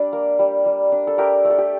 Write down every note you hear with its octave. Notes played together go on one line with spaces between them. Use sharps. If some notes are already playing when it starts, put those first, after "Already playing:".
Already playing: G3 D4 D5
A#3
G3
G3
D4
A4
A3 G4 A#4
A3
A4
G4